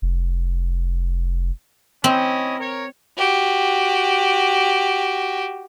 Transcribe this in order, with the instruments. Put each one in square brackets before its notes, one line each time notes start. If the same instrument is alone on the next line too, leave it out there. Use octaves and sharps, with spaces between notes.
[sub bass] F1
[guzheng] C4 [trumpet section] C#4 E4 D#5
[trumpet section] A#4 C#5
[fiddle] F#4 G4